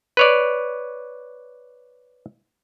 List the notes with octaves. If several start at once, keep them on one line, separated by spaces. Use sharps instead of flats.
B4 C#5 D5